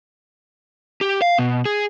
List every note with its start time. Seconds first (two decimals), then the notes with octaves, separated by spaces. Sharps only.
1.01 G4
1.22 F5
1.38 B2
1.65 G#4